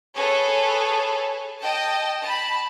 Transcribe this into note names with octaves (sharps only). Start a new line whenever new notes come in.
G#4 A4 B4 C#5
D#5 G5 A5
A5 B5